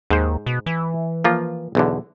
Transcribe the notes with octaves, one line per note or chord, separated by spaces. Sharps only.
D#2 G#2 C5
B2
E3
F3 A#3 F4
B1 E2 D3